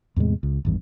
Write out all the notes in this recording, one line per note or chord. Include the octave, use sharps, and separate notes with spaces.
E2 A2 C3 G#3
C#2
G#1 E2 G2